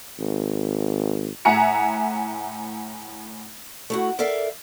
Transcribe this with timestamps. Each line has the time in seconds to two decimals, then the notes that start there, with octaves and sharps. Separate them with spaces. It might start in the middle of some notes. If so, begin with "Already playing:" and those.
0.20 G#1
1.45 A2 E5 F#5 G#5 A#5 C#7
3.90 A3 E4 F#4
4.19 A4 A#4 D5 E5 F5